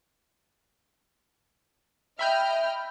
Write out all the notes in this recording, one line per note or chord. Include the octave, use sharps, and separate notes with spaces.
D#5 E5 G5 B5 F6 G6